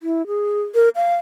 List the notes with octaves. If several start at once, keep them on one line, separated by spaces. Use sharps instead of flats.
E4
G#4
A#4
F5